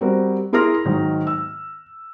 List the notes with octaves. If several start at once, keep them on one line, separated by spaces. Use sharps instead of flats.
G3 C4 F#4 A#4
E4 G#4 A#4 C6 F6 A#6
G#2 D#3 F#3
E6